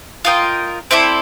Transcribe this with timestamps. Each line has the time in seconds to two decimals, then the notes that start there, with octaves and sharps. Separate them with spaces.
0.25 F4 A#4 D#5 G5
0.91 C4 E4 A4 D5